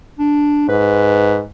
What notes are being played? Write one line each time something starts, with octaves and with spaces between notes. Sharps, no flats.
D4
G#2 B4